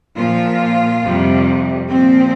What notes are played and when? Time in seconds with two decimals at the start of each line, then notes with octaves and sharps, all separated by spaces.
0.17 A#2 F3 F4
1.03 F2 C3 G3
1.89 A#2 F3 C4